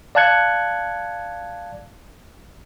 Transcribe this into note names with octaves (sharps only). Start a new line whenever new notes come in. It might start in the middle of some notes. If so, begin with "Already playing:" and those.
D5 F5 A5 F#6 G#6 C#7